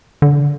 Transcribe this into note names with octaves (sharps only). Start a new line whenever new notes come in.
D3